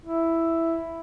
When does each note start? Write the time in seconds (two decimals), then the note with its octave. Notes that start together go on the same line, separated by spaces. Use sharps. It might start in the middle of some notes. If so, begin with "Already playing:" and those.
0.06 E4